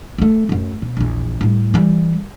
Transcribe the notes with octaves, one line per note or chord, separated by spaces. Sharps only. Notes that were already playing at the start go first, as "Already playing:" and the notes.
A3 B3
F#2 A3
B2
A#1 E2
A2 G3
E3 G3